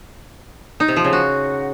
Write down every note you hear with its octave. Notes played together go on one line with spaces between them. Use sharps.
D#4
C3
F3
C#3
F#4